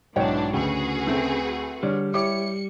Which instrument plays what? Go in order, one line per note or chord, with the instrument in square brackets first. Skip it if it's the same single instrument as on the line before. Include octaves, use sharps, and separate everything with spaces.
[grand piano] B1 G#2 [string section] E3 D4 [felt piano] C#5 F#5 G5
[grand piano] D2 [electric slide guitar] C#3 [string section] F#4 G#4 B4
[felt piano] A3 C4
[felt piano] D3 [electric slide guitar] G3 [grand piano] C#5 F6
[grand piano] E4 G4 C#5 [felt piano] D6 [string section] C#7